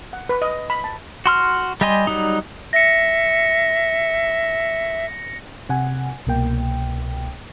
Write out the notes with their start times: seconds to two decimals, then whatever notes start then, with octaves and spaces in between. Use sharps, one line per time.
0.13 F#5
0.29 B4
0.42 D#5
0.70 B5
0.84 A5
1.26 F#4 C6 F6
1.81 G3 G4 D#5 G#5 C6
2.07 F#3 G3 D#4
2.73 E5 A#6 C#7
5.69 C3 F#5 G#5
6.27 C2 B2 A#3 G5